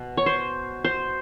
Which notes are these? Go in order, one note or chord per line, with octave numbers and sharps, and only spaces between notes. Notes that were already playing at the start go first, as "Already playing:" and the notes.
Already playing: B2
C#5
C5
C5